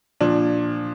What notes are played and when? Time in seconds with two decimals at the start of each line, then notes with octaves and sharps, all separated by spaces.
0.20 A#2 F3 D4